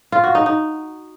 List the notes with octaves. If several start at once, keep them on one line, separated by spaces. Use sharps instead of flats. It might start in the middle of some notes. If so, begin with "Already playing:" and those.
F4
F#4
D#4
D#4